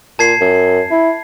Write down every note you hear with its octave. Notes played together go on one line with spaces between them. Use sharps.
A#2 A5 G#6 C7
F#2
E4